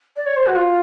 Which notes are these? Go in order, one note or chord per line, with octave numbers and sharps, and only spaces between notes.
D5
C#5
C5
F#4
F4